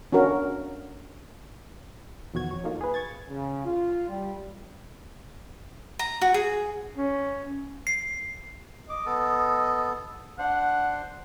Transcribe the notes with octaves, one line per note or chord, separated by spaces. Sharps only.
C#4 D4 F#4 A#4
E2 B2 D#3 F3 F#4 G#6
F2 C#5
F#3 A3 A#3 D#4 F4
G#4 B4
C#6 G#6 A6
C#3
F4
G3
A#5
F#4
G#4
C#4
C7
D#5 D6
B3 A4
D4 C5 F#5